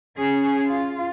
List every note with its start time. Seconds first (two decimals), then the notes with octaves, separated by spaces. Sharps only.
0.17 C#4 G#4
0.66 F4